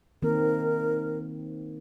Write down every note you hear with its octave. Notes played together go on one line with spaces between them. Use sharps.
D#3 A#3 C4 A#4